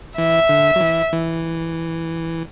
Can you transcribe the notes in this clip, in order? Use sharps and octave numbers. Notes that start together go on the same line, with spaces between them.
E3 E5
D3
F#3
E3
E3